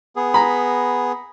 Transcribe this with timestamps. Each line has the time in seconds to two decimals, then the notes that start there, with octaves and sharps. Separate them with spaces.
0.16 B3 G#4
0.34 A#5 B5